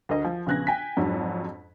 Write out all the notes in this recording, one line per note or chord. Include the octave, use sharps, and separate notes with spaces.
D2 A#4 D#5
F3
A#1 C#3 B3 F#6 G#6 A#6
G5 G#5 B6
F2 G#2 F#3 C#4 D4